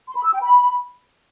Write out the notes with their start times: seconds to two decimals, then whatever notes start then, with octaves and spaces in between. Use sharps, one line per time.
0.08 C6
0.16 B5
0.25 E6
0.33 G5
0.42 B5